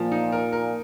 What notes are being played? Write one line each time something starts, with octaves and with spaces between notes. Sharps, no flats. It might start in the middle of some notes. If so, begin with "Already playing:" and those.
Already playing: A#2 F3
D#4
A#4
A#4